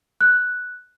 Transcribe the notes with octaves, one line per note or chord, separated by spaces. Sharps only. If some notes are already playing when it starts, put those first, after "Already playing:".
F#6